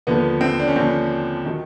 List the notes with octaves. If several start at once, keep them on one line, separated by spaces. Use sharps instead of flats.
D#2 D3 F3 B3
C4
D4
C#4
D#2 D3 F3 C4
D#3 F#3